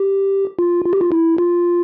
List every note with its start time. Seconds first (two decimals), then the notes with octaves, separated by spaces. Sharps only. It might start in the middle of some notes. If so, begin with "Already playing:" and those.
Already playing: G4
0.59 F4
0.85 F4
0.93 G4
1.01 F4
1.12 E4
1.38 F4